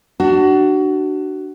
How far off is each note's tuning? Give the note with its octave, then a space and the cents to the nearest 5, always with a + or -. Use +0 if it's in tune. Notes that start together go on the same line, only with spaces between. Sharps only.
D4 +20 F#4 +25